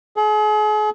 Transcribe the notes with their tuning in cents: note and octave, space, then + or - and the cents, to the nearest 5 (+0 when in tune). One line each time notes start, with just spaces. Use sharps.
G#4 +40